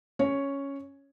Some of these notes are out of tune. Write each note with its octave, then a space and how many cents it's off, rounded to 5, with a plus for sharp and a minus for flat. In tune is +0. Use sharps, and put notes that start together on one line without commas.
C#4 +0 C#5 +0